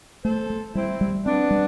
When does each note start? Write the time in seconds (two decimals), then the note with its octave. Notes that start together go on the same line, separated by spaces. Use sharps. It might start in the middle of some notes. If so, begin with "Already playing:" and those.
0.24 A3 A4 C5
0.50 A3
0.75 G3 C4 E4
1.01 G3
1.26 B3 C4 D4
1.51 G3